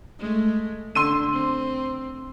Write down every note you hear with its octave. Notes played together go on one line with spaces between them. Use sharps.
G#3 A3
D3 C6 E6 D#7
C4